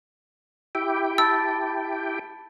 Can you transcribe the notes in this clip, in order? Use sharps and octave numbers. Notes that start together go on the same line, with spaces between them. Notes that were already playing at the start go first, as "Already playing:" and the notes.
E4 G4 G5 E6
A5 B5 E6 A6